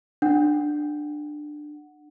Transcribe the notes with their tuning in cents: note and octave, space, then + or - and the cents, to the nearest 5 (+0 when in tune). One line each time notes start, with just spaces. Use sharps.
D4 +20 F#5 +0